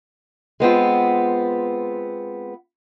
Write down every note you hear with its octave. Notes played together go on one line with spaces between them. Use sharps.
G#3 B3 C4 F4